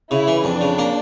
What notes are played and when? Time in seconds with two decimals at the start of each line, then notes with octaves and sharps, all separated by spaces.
0.11 C#3 E4
0.27 E3
0.44 F2 D4
0.61 C#3
0.78 A#3